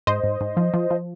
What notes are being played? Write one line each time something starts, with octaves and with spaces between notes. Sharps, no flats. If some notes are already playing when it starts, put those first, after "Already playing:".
G#2 C5 D#5
G#2
G#2
F3
F3
F3